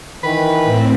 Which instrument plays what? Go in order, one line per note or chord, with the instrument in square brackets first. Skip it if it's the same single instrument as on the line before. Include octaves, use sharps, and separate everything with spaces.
[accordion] D#3 E3 [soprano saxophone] B4
[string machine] A2 C4